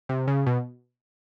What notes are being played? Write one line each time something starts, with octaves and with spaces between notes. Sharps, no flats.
C3
C#3
B2